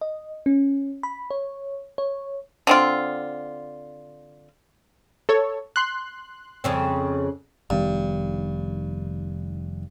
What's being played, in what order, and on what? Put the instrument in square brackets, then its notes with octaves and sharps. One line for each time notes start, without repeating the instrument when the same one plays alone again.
[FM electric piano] D#5
C#4
B5
C#5
C#5
[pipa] D3 C4 F4
[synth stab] A4 C#5
C6 F#6
[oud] F2 C#3 C4
[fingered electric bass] F1 D#3 B3 [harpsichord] G2